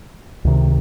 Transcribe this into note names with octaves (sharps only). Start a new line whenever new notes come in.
C#2 C3 D#3